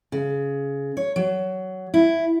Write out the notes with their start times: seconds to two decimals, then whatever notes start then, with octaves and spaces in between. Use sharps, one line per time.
0.12 C#3
0.97 C#5
1.16 F#3
1.94 E4